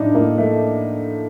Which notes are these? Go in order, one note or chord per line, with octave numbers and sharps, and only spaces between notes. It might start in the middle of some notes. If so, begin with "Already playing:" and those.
Already playing: A2 D4 D#4
A2 A#3
A3